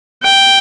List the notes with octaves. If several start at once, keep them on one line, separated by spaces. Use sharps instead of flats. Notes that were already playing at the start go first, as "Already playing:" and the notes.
G5